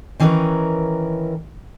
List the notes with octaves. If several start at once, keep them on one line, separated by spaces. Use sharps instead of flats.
D#3 E3 C#4 G#4 A#4 B4